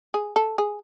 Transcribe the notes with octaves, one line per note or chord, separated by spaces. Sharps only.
G#4
A4
G#4